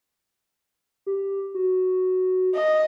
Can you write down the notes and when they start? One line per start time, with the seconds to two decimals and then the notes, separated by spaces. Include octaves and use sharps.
1.06 G4
1.54 F#4
2.55 D#5